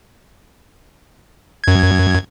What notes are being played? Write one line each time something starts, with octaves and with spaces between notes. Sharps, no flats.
F#2 G#6